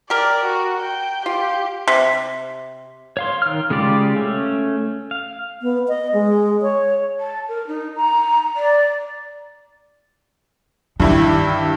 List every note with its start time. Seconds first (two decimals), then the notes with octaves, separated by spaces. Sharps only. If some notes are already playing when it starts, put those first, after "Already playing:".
0.10 G4 A#4 D5
0.44 F#4
0.81 G5
1.26 F4 G4
1.88 C3
3.17 C#5 F5 C6
3.42 D#3 F6
3.70 C#3 G#3 F4 G4 D5
4.16 A3 C#4
5.11 F5
5.62 B3
5.88 D#5
6.13 G#3
6.62 C#5
7.19 A5
7.48 A#4
7.67 D#4
7.96 A#5
8.56 D5
11.00 G2 D#3 E4 G4